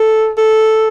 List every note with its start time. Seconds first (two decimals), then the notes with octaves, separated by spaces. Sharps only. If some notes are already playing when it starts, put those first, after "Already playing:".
Already playing: A4
0.38 A4